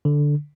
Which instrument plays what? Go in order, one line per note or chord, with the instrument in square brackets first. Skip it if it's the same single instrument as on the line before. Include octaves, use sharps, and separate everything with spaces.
[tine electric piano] D3